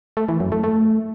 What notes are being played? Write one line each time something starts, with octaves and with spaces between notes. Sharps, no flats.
A3
E3
F#2
A3
A3